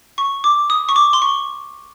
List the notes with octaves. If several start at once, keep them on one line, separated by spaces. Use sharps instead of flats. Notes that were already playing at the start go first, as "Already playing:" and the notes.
C#6
D6
D#6
C#6
D6
C6
C#6